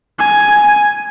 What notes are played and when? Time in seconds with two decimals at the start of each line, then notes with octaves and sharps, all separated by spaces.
0.19 G#5